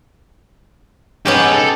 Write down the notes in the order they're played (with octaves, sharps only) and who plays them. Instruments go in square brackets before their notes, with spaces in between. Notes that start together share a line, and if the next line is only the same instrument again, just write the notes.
[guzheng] B3 C#4 G4 [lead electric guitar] D#4 G#4
[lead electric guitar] A4